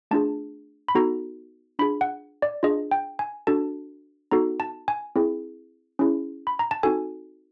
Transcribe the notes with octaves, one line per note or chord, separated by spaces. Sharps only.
A3 D4 F4 G#4 A5
B5
B3 D#4 F#4 A4 A#5
D4 F4 G#4 B5
F#5
D5
D4 F4 G#4 D#5
G5
G#5
D4 F#4 A4 A5
B3 D#4 F#4 A4 A#5
A5
G#5
C4 E4 G#4
C#4 E4 G#4
B5
A#5
A5
C4 D#4 F#4 A4 G#5